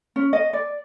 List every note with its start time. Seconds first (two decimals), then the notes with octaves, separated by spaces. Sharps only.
0.16 C#4
0.33 D#5
0.53 D5